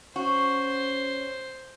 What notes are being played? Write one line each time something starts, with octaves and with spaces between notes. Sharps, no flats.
C#4 F#4 C5